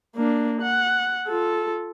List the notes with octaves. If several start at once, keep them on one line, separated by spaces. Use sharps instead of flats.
A#3 D4
F#5
F4 A4